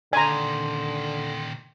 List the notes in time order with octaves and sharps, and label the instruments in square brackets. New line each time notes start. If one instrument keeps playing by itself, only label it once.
[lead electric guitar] A#2 D#3 [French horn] D3 [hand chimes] D5 C6 [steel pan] G#5 A#5